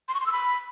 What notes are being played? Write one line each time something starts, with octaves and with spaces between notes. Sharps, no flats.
C6
C#6
C6
E6
B5